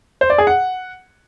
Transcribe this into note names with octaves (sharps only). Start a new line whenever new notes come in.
C5
D5
G#4
F#5